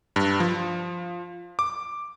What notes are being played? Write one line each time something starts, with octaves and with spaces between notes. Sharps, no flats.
G2
F3
D6